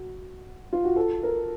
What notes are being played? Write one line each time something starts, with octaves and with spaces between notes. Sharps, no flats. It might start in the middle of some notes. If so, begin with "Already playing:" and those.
Already playing: F#4
F4
F#4
A4
A#4